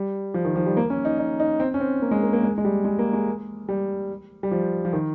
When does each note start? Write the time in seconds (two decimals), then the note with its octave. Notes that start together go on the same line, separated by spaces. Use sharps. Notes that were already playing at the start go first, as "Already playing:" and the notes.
Already playing: G3
0.34 F3
0.45 D#3
0.56 F3
0.66 G3
0.77 A#3
0.90 C#4
1.05 D#4
1.19 D#4
1.40 D#4
1.60 C4
1.74 C#4
1.80 C4
2.02 A#3
2.11 G#3
2.23 A#3
2.33 A#3
2.43 G#3
2.58 G#3
2.65 G3
2.85 G#3
2.99 A#3
3.13 G#3
3.69 G3
4.43 G3
4.51 F3
4.85 F3
4.93 D#3